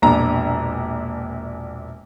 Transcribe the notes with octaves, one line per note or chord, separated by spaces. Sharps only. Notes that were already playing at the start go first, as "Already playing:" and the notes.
E1 A#1 D4 A#5